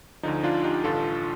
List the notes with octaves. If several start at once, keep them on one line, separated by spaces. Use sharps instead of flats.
D2 D3 F3 D#4
D4 F4
D#4 G4
A1 G2 D3 F4 A4